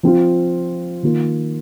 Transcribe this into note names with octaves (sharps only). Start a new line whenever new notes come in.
F3 C4 F4
D#3 A#3 F4